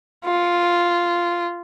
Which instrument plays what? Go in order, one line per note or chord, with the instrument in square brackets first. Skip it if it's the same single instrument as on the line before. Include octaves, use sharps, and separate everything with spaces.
[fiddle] F4